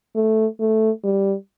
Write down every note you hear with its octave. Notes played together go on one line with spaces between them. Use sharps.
A3
A3
G3